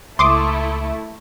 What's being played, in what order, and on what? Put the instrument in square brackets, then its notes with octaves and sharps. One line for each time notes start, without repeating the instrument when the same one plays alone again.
[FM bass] C#2 [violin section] A3 E4 A4 [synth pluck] C6 D6 D#6